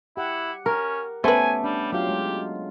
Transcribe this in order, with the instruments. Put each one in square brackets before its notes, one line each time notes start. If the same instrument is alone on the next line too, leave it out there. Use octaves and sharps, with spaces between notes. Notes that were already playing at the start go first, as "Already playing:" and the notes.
[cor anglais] E4 [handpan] G4 F#5
[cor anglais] C#4 [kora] A#4
[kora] A3 [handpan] B3 C#4 G4 [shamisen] B4 C5 [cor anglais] G#5
[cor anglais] G3 [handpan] D4
[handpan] F#3 F4 F5 [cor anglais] G4
[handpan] G#3